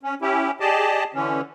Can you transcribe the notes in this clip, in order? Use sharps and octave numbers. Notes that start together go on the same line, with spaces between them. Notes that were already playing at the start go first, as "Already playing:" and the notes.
C#4
C#4 E4 G4
G4 G#4 D5 D#5 A5
D3 E3 C#4